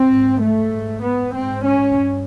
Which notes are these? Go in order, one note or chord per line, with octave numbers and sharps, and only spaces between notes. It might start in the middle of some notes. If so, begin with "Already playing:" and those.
Already playing: C4
G#2
A3
G#2
B3
G#2 C4
C#4
G2